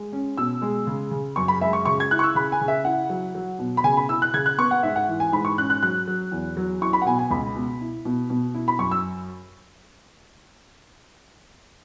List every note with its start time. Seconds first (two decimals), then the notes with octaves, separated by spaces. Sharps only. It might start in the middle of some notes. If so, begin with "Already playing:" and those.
Already playing: G#3
0.13 C#4
0.38 B2 E6
0.62 G#3
0.87 C#3
1.11 C#3
1.36 F#2 C#6
1.48 B5
1.61 G#3 E5
1.73 C#6
1.86 C#3 C#6
2.00 G#6
2.11 E4 F#6
2.19 C#6
2.23 E6
2.35 C#3 B5
2.52 G#5
2.61 C#3
2.68 E5
2.85 E4 F#5
3.10 F#3
3.35 F#3
3.59 B2
3.77 B5
3.84 C#3 G#5
3.97 B5
4.08 E4 E6
4.22 F#6
4.34 C#3 G#6
4.46 F#6
4.58 B3 C#6
4.71 F#5
4.83 G#2 E5
4.96 F#5
5.08 E3
5.20 G#5
5.32 G#2 B5
5.45 C#6
5.57 C#4 F#6
5.70 F#6
5.83 F#3 F#6
6.07 F#3
6.31 E2
6.57 F#3
6.81 E4 C#6
6.93 B5
7.02 F#5
7.06 B2 G#5
7.19 G#5
7.30 C#2 B5
7.56 B2
7.81 E4
8.05 B2
8.30 B2
8.54 E4
8.68 B5
8.79 F#2 C#6
8.91 E6